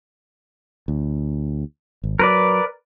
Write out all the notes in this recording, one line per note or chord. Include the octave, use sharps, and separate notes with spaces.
D2
G#1
F#3 A#4 B4 D5